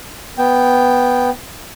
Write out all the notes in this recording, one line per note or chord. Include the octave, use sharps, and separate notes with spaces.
B3 G5